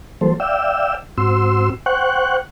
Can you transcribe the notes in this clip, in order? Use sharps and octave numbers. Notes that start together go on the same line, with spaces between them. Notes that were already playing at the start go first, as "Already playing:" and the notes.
E3 F#3 G3 A#3 A4 C5
D5 E5 F5 G5 E6
G#2 C4 F#4 C6 E6
C5 F#5 G5 C#6 F#6